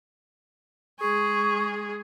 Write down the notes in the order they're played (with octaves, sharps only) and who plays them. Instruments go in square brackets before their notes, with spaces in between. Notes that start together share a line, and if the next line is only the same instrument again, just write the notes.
[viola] G#3 G#4 [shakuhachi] C#6